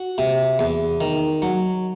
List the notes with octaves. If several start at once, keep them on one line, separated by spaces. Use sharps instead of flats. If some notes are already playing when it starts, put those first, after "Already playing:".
Already playing: F#4
C3
E2
D#3
F#3